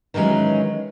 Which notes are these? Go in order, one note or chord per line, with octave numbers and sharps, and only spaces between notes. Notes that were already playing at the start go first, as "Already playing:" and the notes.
D#3 E3 F#3 G#3 C#4